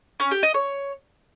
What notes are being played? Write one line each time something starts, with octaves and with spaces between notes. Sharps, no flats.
C#4
G4
D#5
C#5